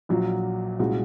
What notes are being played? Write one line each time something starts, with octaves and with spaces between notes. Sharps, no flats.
A#1 A#2 F#3 F#4
C2 A#2 G#3 C#4 F#4